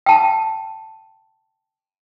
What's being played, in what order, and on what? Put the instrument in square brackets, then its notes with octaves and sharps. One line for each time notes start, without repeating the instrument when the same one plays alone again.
[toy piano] G5 A5